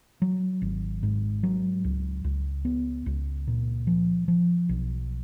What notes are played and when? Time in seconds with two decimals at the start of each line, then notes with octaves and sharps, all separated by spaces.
0.22 F#3
0.62 G#1
1.03 G#2
1.43 F#3
1.84 C#2
2.24 C#2
2.65 B3
3.06 C#2
3.47 A#2
3.87 F3
4.28 F3
4.69 B1